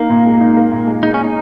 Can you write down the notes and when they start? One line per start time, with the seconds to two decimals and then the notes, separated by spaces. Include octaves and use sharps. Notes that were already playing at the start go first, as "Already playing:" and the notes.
Already playing: A#3 D#4 A#4
0.10 A#2
0.25 G#3
0.41 D#4
0.57 A#4
0.71 A#2
0.87 G#3
1.03 D#4 G#4
1.14 C#4 C#5
1.24 D#4